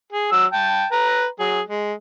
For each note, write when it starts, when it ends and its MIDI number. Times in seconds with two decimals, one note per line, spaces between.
0.13 0.30 68
0.32 0.45 54
0.32 0.45 88
0.53 0.86 79
0.53 0.86 81
0.92 1.26 71
0.92 1.26 82
1.40 1.61 54
1.40 1.61 68
1.68 1.93 56